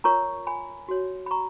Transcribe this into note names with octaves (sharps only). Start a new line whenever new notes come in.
F4 A#4 C#5 A#5 C#6
G#5 B5
F#4 C#5
B5
A#5 C#6